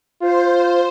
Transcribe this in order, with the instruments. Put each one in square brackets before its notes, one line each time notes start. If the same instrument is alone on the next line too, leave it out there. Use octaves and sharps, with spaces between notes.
[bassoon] F4 [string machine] C5